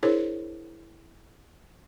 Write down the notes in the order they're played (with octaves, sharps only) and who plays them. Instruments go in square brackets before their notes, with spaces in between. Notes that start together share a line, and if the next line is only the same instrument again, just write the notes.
[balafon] D4 E4 G#4 A#4 C5 C#5